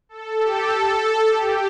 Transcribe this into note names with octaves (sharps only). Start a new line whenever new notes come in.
A4
G4
A4
A4
G4